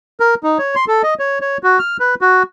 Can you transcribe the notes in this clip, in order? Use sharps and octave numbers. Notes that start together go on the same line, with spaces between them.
A#4
D#4
C#5
C6
A4
D#5
C#5
C#5
F#4
F6
B4
F#4